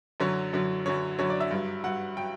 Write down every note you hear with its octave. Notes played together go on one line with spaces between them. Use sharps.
F#2 D3 F#3 C#5
F#2 D3 F#3
F#2 D3 F#3 C#5
F#2 D3 F#3 C#5
D5
E5
G2 F#3
G2 F#3 F#5
F#3 G5